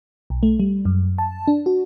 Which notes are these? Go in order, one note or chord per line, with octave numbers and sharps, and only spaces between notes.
B1
A3
G3
F#2
A5
D4
F#4